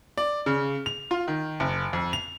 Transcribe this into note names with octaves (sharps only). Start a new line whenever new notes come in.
D5
C#3
F7
F4
D#3
F#1
F2
F7